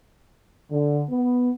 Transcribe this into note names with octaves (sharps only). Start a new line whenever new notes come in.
D3
B3